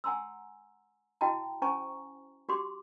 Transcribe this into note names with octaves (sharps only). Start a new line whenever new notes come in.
F#5 G#5 A#5 C6 E6
E4 F#4 D#5 G5 A5 A#5
C#4 C5 G#5 A#5 C#6
F#4 G4 C6 D6